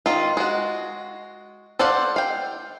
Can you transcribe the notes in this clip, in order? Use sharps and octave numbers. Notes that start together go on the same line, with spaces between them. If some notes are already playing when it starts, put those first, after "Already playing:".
D#3 F4
G#3 F#4
A4 C5 D5 F5 F#5
F5 G5